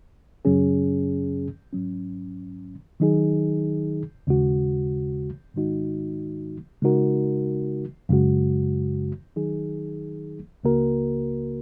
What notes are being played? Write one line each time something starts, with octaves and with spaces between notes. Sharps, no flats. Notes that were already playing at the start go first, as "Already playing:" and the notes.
F#2 C#3 F#3 C#4 G#4
G#2 F#3 C#4
D#3 F#3 D#4 G#4
D#2 C#3 G#3 F#4
G#2 D#3 G#3 D#4 F#4
C#3 G#3 D#4 F#4 A#4
F#2 C#3 G#3 F#4
D#3 F#3 D#4 G#4
C#2 C#3 A#3 F#4 A#4